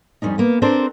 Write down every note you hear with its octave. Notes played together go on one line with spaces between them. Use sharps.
F2 G3 G#3 C#4 D#4
A#3 B3
C4 D4 G4 A4 A#4 C5